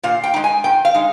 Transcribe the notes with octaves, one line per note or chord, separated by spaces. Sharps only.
A#2 F5
G5
G#3 D#4
G#5
A#2 G5
F5
G#3 D#4